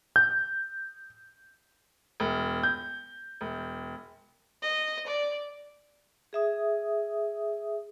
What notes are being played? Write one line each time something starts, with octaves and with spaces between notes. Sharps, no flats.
G6
E1
G6
E1
D#5
D5
G#4 E5 D#6